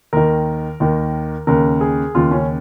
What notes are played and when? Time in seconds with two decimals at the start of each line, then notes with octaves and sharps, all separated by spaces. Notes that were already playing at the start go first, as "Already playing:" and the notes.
0.13 D#2 D#3 A#4
0.80 D#2 D#3
1.47 D#2 C#3 A#4
1.81 G#4
2.15 D#2 C#3 F4
2.31 C#4